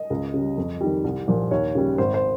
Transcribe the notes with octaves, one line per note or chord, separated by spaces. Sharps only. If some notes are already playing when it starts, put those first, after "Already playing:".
Already playing: D#5
C#2
C#3 G3
F2
D#3 G3
C2
A#2 F3
D#2 C#5
C#3 G3
G#1 C5
C5